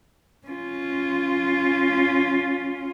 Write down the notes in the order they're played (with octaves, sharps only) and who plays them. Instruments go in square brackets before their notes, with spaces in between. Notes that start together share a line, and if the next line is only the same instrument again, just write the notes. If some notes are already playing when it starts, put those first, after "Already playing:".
[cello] C#4 F4